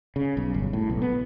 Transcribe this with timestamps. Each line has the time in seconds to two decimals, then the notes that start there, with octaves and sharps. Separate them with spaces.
0.16 C#3
0.37 B1
0.54 G1
0.73 A2
0.89 B1
1.02 B3